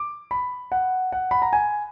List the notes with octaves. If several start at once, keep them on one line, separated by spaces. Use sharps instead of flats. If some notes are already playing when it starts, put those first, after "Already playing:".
Already playing: D6
B5
F#5
F#5
B5
A#5
G#5